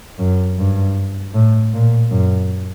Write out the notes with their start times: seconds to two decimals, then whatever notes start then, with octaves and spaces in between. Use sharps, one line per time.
0.19 F#2
0.58 G2
1.35 A2
1.74 A#2
2.11 F#2